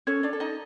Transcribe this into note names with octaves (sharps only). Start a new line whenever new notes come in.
C#4 A4 C#5
D4 D5
A4
D#4 D#5